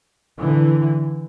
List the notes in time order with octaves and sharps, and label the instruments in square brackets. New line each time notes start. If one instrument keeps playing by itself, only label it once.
[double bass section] D3 E3